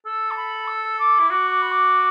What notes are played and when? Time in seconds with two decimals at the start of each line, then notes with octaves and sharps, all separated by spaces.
0.05 A4 E6
0.31 A5
0.37 B5
0.68 E6
0.99 D6
1.19 E4
1.30 F#4 D6
1.51 D6
1.62 B5
1.71 D6